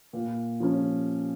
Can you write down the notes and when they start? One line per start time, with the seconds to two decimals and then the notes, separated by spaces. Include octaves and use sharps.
0.13 A#2
0.60 F3 C#4